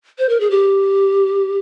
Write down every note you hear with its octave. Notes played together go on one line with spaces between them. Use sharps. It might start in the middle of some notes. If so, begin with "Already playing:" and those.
C5
A#4
G#4
G4